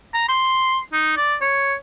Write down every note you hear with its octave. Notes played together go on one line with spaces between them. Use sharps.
A#5
C6
D#4
D5
C#5